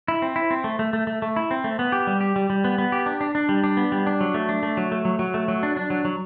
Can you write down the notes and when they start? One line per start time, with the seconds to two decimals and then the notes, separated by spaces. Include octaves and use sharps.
0.08 E4
0.22 C4
0.36 E4
0.51 C4
0.64 A3
0.79 A3
0.93 A3
1.07 A3
1.22 A3
1.36 E4
1.51 C4
1.64 A3
1.79 B3
1.92 G4
2.07 G3
2.21 G4
2.36 G3
2.50 G3
2.64 B3
2.78 B3
2.92 G4
3.06 D4
3.21 D4
3.35 D4
3.49 G3
3.64 D4
3.77 B3
3.92 G3
4.07 D4
4.21 F#3
4.34 A3
4.49 D4
4.63 A3
4.77 F#3
4.92 A3
5.05 F#3
5.19 F#3
5.34 A3
5.48 F#3
5.63 D4
5.77 D4
5.90 F#3
6.05 F#3